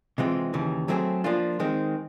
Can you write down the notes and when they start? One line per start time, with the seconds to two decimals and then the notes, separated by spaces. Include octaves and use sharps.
0.18 C3 E3 G#3 C4 F4
0.54 D#2 C#3 E3
0.88 F#3 A3 C4 E4 G#4
1.24 F3 A#3 D4 F4
1.60 D#3 G#3 C4